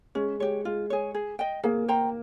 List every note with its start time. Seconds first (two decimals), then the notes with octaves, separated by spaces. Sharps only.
0.15 G#3 C#4
0.40 G#3 G4 C#5
0.65 G#3 F4
0.90 G#4 C#5
1.14 G#4
1.39 D#5 G5
1.64 A#3 G#4
1.88 C5 G5 A#5